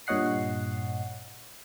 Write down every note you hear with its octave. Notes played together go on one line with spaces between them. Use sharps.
G2 A#2 C#5 D#5 F#5 C7